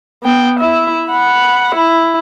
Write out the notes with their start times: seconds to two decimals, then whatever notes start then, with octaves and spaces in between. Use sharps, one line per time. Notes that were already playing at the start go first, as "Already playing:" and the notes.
0.23 B3 G5
0.60 E4 E5
1.07 F#5 B5
1.75 E4